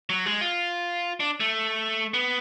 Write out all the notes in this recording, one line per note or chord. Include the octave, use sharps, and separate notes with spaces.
F#3
G#3
F4
D4
A3
B3